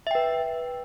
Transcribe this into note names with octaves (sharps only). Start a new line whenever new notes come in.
B4 E5 G5